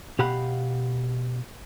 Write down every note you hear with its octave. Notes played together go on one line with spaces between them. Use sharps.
B2 G4 F5 F#5 B5